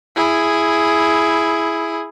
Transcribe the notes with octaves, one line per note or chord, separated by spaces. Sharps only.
E4 G#4